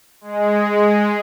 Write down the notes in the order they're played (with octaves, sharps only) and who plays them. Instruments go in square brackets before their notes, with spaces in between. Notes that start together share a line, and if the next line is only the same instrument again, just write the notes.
[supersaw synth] G#3